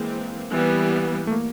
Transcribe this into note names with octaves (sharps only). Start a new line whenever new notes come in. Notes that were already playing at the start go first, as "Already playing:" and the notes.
Already playing: E3 G#3 A#3 C4
E3 G3 B3
A3
A#3